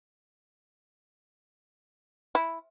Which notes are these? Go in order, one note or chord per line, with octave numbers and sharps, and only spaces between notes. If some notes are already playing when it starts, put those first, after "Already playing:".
E4